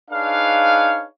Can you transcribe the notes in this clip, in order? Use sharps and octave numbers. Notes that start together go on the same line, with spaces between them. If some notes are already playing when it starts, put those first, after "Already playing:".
D4 D#4 G#4 B4 C#5 F5